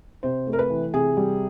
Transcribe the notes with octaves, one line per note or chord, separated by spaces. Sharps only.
C3 C5
A3
A#4
B4
E3
C3 G#4
G3